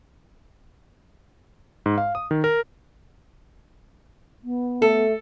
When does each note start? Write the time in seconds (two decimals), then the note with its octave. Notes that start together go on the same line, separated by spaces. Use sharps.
1.86 G#2
1.98 F5
2.15 D#6
2.31 D#3
2.44 A#4
4.44 B3
4.82 A3 A4